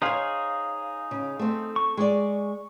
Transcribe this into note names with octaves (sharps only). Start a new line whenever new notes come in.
D#4 G#4 C5 C#5 F5
C#3
A3 C4
C#6
G#3 D5